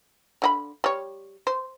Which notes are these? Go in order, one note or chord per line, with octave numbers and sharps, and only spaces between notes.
D3 F#4 B5
G3 C#5
C5